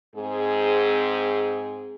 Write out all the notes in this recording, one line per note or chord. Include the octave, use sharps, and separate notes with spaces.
G#2 C4 G#4